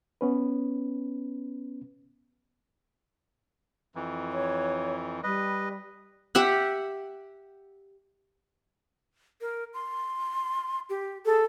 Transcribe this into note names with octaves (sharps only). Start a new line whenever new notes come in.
B3 C#4 B4
F2 E3
C#5
G3 B4 D#5
G4 E5 F#5
A#4
C6
G4
G#4 A4